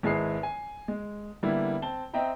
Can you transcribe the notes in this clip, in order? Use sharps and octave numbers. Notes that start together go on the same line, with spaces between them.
G#1 G#3 E4 G#4 B4 C7
G#5
G#3
D3 G3 A#3 B3 E4
C4 A5 G7
C4 D#5 E5 G5 A#5